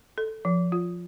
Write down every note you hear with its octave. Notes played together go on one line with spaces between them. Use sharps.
A4
F3
F4